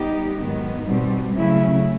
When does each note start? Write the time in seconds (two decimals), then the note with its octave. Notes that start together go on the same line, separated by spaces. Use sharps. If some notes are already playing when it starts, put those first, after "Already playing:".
Already playing: G3 B3 D#4 G4
0.38 G#2 D#3 F#3 B3
0.86 B2 G3 C4
1.34 C#3 F#3 A3 C#4 E4